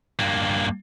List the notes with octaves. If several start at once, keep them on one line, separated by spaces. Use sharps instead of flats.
G2 A#3